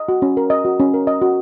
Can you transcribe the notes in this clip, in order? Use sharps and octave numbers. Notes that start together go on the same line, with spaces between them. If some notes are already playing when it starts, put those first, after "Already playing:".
Already playing: D#5
F#4
C#4
A#4
D#5
F#4
C#4
A#4
D#5
F#4